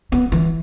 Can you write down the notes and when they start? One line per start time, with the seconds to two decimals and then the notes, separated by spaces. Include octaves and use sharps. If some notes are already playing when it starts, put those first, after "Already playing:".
0.12 B3
0.32 E3